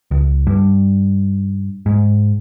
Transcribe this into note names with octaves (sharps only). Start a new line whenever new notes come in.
C#2
G2
G#2